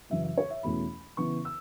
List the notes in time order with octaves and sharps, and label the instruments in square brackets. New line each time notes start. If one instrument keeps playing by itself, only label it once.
[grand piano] F#2 C#3 E3 E5
E5
C#5
E5
E2 B2 A3 C#4 E4 B5
C#3 E3 B3 E4 C#6
E6